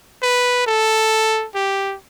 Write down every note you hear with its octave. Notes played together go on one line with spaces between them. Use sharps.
B4
A4
G4